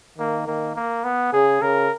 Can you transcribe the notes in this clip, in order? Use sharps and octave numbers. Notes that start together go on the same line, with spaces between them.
D#3 A#3
D#3 A#3
A#3
B3
C#3 G#4
C#3 A#4